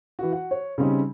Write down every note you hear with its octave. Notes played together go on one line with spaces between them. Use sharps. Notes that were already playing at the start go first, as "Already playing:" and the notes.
E3 F#4
F#4 F#5
C#5
C#3 G3 C4 C#4 D#4